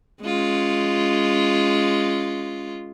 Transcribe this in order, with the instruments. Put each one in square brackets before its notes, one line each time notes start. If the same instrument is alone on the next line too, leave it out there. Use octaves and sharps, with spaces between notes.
[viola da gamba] G#3 C#4 F4